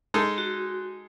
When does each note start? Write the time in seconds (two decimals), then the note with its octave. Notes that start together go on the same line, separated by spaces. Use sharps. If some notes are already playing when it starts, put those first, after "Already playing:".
0.14 G#3 D#4 A4
0.38 F#4